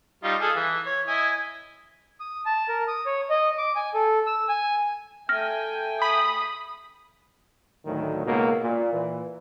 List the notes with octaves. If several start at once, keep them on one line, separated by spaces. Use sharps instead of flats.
G3 D#4 F4
G#4 A4 F5
E3
C#5
E4 D#5 G#5
D#6
A5
A#4
D#6
C#5
D#5
D6
G#5
A4
E6
G#5
A3 G5 G#5 F6 A#6
B5 D#6
D2 A2 D#3 F#3
C#2 G#2 B2 A#3
A#2
A#2 E3